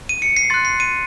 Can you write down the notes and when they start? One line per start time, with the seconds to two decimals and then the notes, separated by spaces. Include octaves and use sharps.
0.09 D#7
0.22 C#7
0.37 C7
0.50 C6 F#6 A6
0.65 C7
0.80 D#7